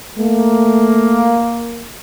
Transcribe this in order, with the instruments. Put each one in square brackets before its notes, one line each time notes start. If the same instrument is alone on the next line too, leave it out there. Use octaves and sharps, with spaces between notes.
[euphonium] A3 [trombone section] A#3